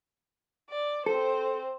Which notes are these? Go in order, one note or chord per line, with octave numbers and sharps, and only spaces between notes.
D5
C4 A4 C5